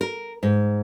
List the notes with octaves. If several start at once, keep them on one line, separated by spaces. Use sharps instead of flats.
A#4
G#2